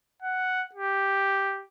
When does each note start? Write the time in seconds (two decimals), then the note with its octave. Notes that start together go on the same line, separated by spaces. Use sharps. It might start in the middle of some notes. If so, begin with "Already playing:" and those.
0.22 F#5
0.75 G4